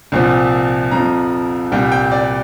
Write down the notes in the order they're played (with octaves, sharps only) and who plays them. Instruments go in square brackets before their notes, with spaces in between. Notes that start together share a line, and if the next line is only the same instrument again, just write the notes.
[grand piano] C2 A#2 F3
F2 F3 A#5
C2 A#2 G3 G5
G5
D5